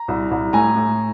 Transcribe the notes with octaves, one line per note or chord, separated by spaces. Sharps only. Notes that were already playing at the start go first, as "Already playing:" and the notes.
Already playing: A#5
C2
C2
A2 G#5 A#5
A2